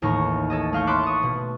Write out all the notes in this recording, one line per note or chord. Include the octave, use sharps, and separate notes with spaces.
A1 D#2 A2 D#4 A#5 C#6
A4 C#5 D#5
A3 D#5 F5 C#6 G6
A5 B5 C6 D6 F#6
C#6 D#6
B2